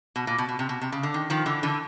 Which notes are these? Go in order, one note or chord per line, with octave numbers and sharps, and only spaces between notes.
B2
A#2
B2
B2
C3
B2
C3
C#3
D3
D#3
D#3 F3
D3 E3
D3 E3